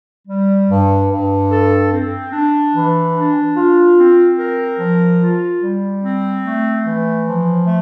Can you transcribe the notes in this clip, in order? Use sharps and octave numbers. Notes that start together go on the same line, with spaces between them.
G3
G2
G2
A4
C4
D4
E3
D4
F4
C4
A#4
F3
F4
G3
C4
A3
E3
F3
A3